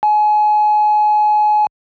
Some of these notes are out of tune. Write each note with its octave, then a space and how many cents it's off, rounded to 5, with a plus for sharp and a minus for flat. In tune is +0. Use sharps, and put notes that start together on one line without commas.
G#5 +30